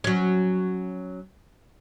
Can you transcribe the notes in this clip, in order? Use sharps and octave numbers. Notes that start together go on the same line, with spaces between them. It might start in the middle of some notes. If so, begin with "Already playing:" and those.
F#3 C#4